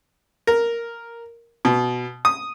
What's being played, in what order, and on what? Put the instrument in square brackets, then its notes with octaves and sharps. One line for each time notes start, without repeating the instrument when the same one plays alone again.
[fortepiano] A#4
B2
D#6